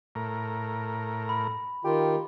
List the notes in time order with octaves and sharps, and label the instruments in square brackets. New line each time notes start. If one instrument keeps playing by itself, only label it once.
[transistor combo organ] A2 A#4
[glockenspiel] B5
[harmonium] D#3 F4 [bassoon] G4